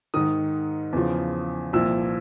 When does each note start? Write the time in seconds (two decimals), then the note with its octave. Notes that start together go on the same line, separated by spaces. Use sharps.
0.14 G#2 D#3 D#6
0.93 E2 C#3 F3
1.73 C2 A#2 F3 E6